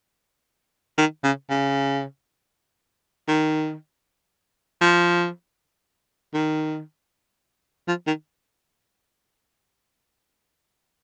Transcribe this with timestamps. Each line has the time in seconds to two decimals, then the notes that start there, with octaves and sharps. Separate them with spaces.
0.98 D#3
1.24 C#3
1.50 C#3
3.28 D#3
4.81 F3
6.34 D#3
7.88 F3
8.07 D#3